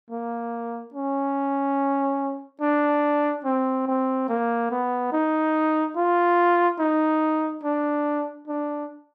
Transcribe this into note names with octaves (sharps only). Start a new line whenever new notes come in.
A#3
C#4
D4
C4
C4
A#3
B3
D#4
F4
D#4
D4
D4